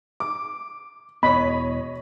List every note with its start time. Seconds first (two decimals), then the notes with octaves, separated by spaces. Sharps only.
0.20 D6
1.23 E1 F2 B3 C#5 D#5 B5